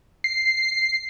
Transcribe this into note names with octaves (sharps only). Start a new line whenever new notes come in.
C7